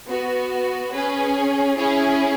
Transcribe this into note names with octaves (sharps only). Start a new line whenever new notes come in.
B3 F#4
C#4 G#4 B4
C#4 E4 G#4 C#5